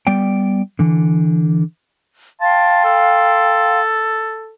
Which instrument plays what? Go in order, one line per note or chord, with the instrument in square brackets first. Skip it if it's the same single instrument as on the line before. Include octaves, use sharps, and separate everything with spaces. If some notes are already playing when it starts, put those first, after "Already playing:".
[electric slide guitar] G3 B3 D5 G5
D3 E3
[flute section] F5 G5 C6 [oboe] A5
[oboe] A4